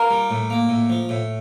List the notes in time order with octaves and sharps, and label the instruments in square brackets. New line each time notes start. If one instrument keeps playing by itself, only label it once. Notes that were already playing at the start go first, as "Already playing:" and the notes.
Already playing: [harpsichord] F4 [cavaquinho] A#4
[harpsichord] G3
A2
A#3
A2
F3
A2